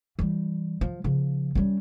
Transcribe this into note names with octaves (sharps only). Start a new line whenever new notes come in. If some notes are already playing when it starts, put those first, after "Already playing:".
E3 G3
F3
C#3 F3
G3 C#4